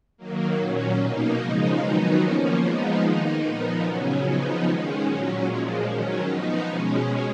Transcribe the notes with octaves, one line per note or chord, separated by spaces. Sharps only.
D#3 F#3 A#3
A#2 F#3 C#4
B2 A#3 D#4
C#3 F3 G#3 D#4
D#3 F#3 B3 D#4
F3 A#3 C#4
F3 G#3 B3 D#4
D#3 A#3 D#4
A#2 F3 B3 D#4
C#3 F#3 C#4
C#3 F3 B3 D#4
D#3 G#3 C#4
A#2 F#3 C#4
A#2 F3 G#3
D#3 F#3 C#4
F3 B3 D#4
B2 G#3 C#4